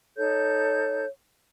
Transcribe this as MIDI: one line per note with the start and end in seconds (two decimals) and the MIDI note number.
0.18 1.05 63
0.18 1.05 69
0.18 1.08 73
0.18 1.05 91